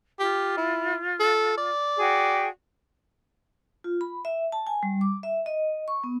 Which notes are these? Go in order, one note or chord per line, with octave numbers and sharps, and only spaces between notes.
F4 G4
E4
A4
D5
F#4 G#4 G5
F4
B5
E5
A5
G#5
G3
D6
E5
D#5
C#6
B3